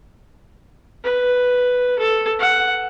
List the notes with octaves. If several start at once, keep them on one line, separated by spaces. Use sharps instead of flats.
B4
A4
F#5